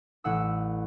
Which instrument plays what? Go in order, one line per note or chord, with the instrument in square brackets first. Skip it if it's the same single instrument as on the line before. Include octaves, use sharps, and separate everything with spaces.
[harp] A1 F#5 E6